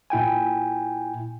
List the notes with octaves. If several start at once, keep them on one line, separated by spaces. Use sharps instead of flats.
A#2 E4 G5 G#5